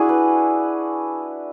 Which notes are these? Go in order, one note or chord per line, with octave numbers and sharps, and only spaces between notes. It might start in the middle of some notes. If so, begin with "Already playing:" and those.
Already playing: D4 E4 F#4 G#4
B4